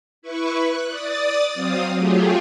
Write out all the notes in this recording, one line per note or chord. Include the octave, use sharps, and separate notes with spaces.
E4 B4 C#6
F#6
D5 D#6 A6
F#3 C4 F5 D#6
F#3 A3 F4 G4 G#4